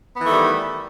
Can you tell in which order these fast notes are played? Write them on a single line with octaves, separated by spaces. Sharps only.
B3 E3 A3 D#3 G3